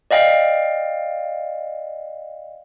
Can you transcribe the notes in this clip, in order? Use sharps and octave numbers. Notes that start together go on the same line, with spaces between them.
D5 D#5 F5 G5